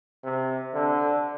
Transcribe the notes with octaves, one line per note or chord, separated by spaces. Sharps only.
C3
D3